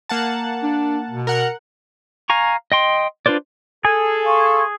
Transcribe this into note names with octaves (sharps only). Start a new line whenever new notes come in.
A#3 F#5 A5
D4
B2
A#4 F#5
F5 G#5 A#5 C#6
D#5 G5 C6
D4 F4 B4 C5 D5
G#4 A4 G#5
F5 C6 C#6